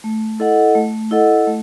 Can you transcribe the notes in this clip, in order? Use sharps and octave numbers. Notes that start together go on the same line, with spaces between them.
A3
E4 A4 D#5 F#5
A3
E4 A4 D#5 F#5
A3